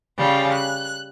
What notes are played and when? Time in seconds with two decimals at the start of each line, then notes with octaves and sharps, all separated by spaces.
0.18 C#3 G3 F4
0.52 F#6